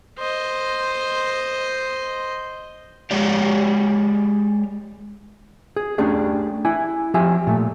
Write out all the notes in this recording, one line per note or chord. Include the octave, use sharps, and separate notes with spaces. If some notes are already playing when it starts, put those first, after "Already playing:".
C5 D#5
G#3 G4 C#5 D5
G#4
A3 C#4 D4 G4 G#4
E4 G#5
F3 G4 E5 G#5
A#2 A3